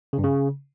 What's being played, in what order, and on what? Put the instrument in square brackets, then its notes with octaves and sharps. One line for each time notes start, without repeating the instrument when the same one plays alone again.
[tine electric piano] C#3
G2
C#3